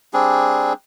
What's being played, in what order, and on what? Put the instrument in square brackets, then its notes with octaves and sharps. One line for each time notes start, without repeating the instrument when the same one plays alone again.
[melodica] G3 C4 D4 G#4